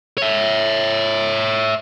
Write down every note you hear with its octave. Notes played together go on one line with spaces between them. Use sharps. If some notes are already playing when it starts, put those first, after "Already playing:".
C#5 E5